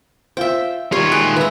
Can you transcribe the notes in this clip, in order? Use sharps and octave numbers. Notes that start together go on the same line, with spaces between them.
F4 C5 E5 G5
D#3 G3 F4 C#5
G#3 F#6 D7
B4 E5 A#5